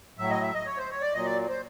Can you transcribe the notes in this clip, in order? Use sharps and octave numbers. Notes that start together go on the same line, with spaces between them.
A2 F#3 E5
D#5
E5
D#5
C#5
C5
C#5
D5
A#2 F#3 D#5
D5
C5